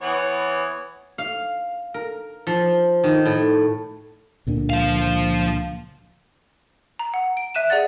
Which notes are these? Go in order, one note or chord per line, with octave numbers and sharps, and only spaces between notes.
E3 B3 C#5
F5
A#4
F3
D#3
A2
C#2 A#2 D3
F3 F5
A#5
F#5
D7
E5 F#6 D#7 E7
G#4 D5 F#5 A6